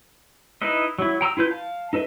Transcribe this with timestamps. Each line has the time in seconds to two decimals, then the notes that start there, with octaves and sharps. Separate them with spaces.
0.62 D#4 E4 B4 D#5
0.99 F#3 E4
1.21 G5 A#5 D#6 E6
1.37 E4 F4 B4 G6
1.51 F5 A5
1.93 D#4 A4 B4 D#5 E5